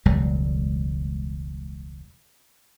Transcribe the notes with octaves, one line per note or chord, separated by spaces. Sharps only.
E1 C#2 F#3 G3